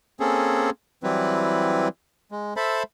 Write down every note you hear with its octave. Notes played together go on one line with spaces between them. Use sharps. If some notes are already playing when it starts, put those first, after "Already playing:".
A#3 C4 C#4 G#4 A4
E3 F#3 G3 C4 E4 B4
G#3
A4 C5 E5 A5 B5